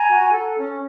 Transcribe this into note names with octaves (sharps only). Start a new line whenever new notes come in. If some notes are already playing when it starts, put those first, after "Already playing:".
Already playing: G#5 A#5
F#4
A4
C#4